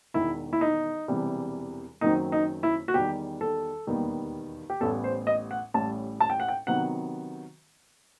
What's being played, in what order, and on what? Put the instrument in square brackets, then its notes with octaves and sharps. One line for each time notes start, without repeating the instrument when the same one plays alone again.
[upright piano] E1 E2 D#3 E4
E4
D#4
E1 E2 C3 E3 G3
F#1 F#2 D#3 F#3 C4 D#4
D#4
E4
F#4
E2 D#3 G3 G4
A4
E1 D#2 D#3 G3 B3
G4
A1 A2 G3 B3 A4
C5
D#5
F#5
A1 A2 G3 A5
A5
G5
F#5
G5
C3 D#3 F#3 B3 F#5